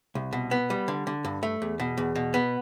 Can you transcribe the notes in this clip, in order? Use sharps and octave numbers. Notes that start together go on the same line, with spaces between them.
C2
B2
B3
G3
D3
D3
G2
A3
E2
B2
E2
B2
B3